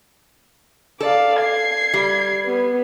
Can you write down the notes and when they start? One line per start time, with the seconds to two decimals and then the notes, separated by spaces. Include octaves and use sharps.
1.01 A4 D5 F5
1.40 G#6 C7
1.94 G3
2.45 B3